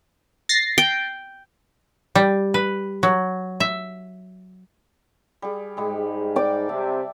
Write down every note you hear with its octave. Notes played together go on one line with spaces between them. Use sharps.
A6 A#6 C7
G5
G3
B4
F#3
E5
G3 G#4
G#2 G3 G#3 G4
D5 G5
C3 E5 A5